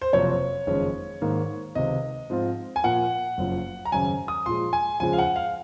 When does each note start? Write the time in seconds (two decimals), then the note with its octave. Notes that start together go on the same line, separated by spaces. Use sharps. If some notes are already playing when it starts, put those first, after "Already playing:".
0.02 C5
0.13 F#1 F2 C3 F#3 C4 C#5
0.67 F#1 F2 D#3 G#3 C#4
1.21 G#2 D#3 A#3
1.75 C#2 C3 D#3 D#5
2.30 G#2 F3 C4 F4
2.76 G#5
2.83 A#2 F3 A#3 F#5
3.38 F#1 F#2 F3
3.85 A#5
3.92 G#1 F#2 C#3 G#5
4.28 D#6
4.46 A#2 F3 G#3 C6
4.73 G#5
5.00 F2 C#3 F3 G#3 G#5
5.13 F5
5.18 F#5
5.36 F5